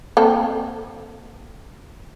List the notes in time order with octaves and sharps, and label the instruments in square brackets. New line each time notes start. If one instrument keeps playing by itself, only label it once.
[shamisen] A#3 C4 A4